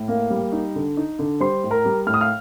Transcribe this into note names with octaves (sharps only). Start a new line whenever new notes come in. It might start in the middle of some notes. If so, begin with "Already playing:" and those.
Already playing: A2
A#3
G3
D#4
D3
D#4
D3
G3 C5 C6
A2
A#4 A#5
G3
A2 F6
D#6
F5 F6